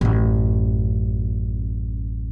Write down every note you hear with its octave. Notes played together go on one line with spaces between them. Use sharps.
A1 F#2